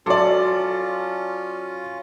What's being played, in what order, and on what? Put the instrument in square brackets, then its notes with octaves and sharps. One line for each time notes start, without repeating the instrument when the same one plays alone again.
[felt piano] F#3 C6 D6 [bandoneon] C#4 F4 [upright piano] A4 D5